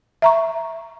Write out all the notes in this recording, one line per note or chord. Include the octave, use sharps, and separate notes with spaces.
E5 A#5 C#6